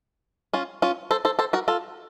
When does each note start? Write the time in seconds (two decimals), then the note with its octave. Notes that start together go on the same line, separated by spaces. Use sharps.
0.53 C#4 F4
0.82 C#4 F4
1.11 A4 C5
1.25 A4 C5
1.39 A4 C5
1.53 F#4 A#4
1.68 F4 A4